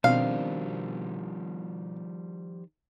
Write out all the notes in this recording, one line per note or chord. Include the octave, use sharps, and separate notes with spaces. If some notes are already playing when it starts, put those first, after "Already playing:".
B2 D#3 F3 G3 C4 D4 F5